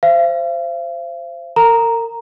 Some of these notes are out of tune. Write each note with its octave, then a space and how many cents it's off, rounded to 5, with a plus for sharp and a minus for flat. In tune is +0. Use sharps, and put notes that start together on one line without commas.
C5 +0 F5 -45
A#4 -35 A#5 +0